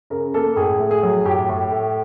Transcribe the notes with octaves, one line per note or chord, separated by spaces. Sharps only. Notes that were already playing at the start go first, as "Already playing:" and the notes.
C#3 A#4
A#3 A4
A2 G#4
A3
G#4
F#3
A2 G4
A2
A3